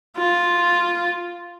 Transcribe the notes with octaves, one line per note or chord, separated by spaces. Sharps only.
F4